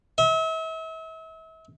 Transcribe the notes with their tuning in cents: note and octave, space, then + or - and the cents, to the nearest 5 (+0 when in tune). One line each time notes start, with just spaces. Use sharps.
E5 -40